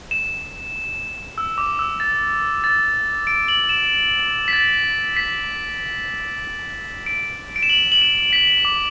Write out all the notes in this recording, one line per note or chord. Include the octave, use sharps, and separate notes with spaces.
E7
E6
D6
E6
A6
A6
D7
F#7
E7
B6
A6
B6
D7
D7
E7
F#7
F#7
E7
B6
D6